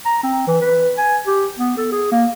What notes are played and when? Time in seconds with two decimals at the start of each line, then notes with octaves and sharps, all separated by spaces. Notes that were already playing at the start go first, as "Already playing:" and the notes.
0.06 A#5
0.23 C4
0.48 E3
0.62 B4
0.97 G#5
1.27 G4
1.59 B3
1.78 A4
1.92 G#4
2.12 A#3